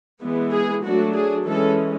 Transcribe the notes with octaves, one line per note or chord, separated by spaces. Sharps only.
E3 G#3 B3
G#4
F#3 A3 D4 F#4
G#4
E3 G#3 C#4 A4